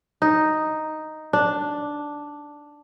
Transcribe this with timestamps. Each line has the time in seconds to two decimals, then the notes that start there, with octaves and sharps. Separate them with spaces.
0.22 D#4
1.33 D4